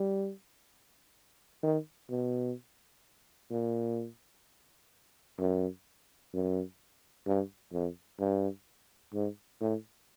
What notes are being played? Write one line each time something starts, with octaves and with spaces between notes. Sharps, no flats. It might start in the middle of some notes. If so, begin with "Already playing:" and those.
Already playing: G3
D#3
B2
A#2
F#2
F#2
G2
F2
G2
G#2
A2